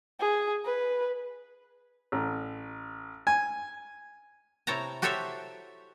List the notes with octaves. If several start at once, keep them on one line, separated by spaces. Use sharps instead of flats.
G#4
B4
A1
G#5
C3 E4 C#5 G5 A5 A#5
F#4 G4 A4 C5 C#5 E5